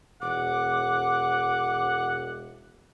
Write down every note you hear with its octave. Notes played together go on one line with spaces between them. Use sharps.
E1 F#5 D6